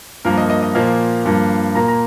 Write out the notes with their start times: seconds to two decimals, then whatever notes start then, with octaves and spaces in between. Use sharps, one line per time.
0.25 G2 F3 A#3 A#4
0.38 D#5
0.50 D#5
0.63 D#5
0.75 A#2 F3 A#3 F5
1.26 G2 F3 A#3
1.75 A#2 A#3 A#5
1.88 A#5